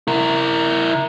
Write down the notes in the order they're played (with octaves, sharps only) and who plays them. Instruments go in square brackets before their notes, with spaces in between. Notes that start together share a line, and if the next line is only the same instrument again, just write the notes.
[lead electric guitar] E4 A#4